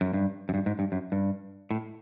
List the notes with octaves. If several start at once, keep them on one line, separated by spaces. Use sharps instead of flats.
F#2
G2
F#2
G2
G#2
G2
F#2
G2
A2